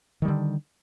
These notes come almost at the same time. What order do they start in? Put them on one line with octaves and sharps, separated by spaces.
D#3 G3 D3